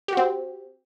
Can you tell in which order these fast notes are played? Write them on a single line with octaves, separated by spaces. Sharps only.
G4 F#4 C4